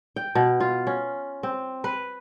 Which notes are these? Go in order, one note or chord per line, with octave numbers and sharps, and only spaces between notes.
G5
B2
F4
C#4
C4
B4